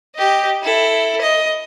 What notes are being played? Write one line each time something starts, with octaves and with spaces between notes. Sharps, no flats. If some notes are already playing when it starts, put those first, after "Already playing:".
G4 D#5
E4 A4
D#5